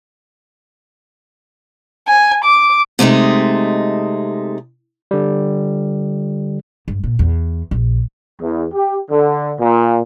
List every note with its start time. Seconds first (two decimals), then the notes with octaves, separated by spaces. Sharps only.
2.08 G#5
2.44 D6
2.99 C3 G#3 A3 D#4
5.11 D3 G3
6.88 G2
7.04 A#2
7.19 E2
7.71 A#1
8.42 E2
8.74 G4
9.11 D3
9.60 A#2